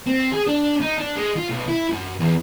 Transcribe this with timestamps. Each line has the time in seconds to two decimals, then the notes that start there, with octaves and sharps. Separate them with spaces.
0.07 C4
0.32 G#4
0.46 D4
0.81 D#4
0.98 D4
1.17 G#3
1.37 F4
1.50 B1
1.69 E4
1.91 F#2
2.20 E2